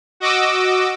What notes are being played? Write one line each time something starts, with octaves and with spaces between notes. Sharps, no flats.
F#4 D#5 D6 E6